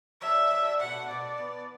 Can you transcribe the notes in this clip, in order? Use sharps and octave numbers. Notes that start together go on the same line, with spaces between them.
F#3 D4 A4 E5
F#3 D4 A4
B2 A3 D4 F#5
B2 A3 D4 D5
E3 B3 D4 B4